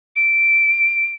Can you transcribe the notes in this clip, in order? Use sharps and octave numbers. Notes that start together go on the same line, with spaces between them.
D7